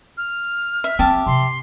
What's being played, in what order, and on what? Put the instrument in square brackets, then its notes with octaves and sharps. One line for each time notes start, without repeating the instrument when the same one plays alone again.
[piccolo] F6
[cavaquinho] E5
[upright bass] C4 [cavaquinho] G4 E5 A5
[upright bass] C3 [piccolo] C6